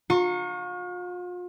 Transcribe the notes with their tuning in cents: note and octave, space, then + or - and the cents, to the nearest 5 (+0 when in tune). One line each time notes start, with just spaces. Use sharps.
F4 +40 A#5 -15 C#6 -15